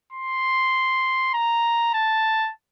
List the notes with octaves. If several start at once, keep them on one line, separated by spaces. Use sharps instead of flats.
C6
A#5
A5